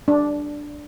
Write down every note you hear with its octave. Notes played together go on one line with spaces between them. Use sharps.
D4